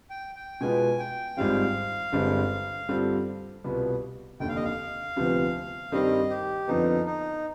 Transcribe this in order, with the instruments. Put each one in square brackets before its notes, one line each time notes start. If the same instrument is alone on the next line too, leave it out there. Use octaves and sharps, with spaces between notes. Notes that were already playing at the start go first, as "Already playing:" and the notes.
[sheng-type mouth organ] G5
G5
[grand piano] B2 G#3 B3 F4 B4 [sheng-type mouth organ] G#5
[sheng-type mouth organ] G5
[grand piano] G#1 G#2 G3 C4 F4 [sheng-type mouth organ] F5
[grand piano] G1 G2 D3 G#3 C4
G2 D3 G3 C4 F4
C2 B2 B3 F4 B4
[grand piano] F1 D#2 D3 [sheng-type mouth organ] G5
[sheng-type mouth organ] F5
D#5
F5
[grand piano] D2 C3 F3 B3
[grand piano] G2 D#3 G3 C4 [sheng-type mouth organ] D#5
[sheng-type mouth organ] G4
[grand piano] F2 D3 F3 B3 [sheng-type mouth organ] D#4
[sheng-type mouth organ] D#4